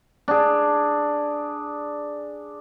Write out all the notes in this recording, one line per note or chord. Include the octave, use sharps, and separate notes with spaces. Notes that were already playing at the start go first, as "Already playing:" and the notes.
D4 G#4